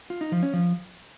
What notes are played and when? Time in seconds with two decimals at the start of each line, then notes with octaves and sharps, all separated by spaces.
0.10 F4
0.21 D#4
0.32 F3
0.43 C#4
0.53 F3